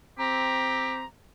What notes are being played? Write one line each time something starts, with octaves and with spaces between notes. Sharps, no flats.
C4 G4 A#5